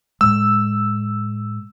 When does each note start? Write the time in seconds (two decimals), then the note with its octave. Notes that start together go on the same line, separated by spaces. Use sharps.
0.21 A2 G#3 E6